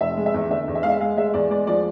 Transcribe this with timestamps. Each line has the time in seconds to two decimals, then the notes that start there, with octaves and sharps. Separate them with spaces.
0.01 F1 E5
0.17 G#3
0.26 E5
0.34 E2
0.50 D3 E5
0.68 E2
0.75 E5
0.83 G#3 F5
0.89 E5
1.00 G#3 F5
1.17 G#3 E5
1.34 E2 D5
1.50 G#3 D5
1.67 F3 D5